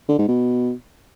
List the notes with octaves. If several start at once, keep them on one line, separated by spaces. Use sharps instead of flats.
D3
G#2
B2